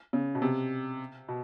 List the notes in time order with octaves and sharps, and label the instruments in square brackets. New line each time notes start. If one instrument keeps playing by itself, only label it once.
[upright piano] C#3
B2
C3
B2